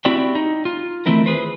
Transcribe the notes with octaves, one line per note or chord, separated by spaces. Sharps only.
C4 E4 F#4 G4 D5 G5
D#4
F4
D#3 E3 A3 C4 E4 A#4
G#4 B4 C5